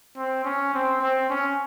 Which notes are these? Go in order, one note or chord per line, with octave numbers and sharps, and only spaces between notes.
C4
C#4
C4
C4
C#4